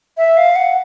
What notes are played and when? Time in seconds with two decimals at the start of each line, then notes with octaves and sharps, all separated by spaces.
0.17 E5
0.37 F5
0.56 F#5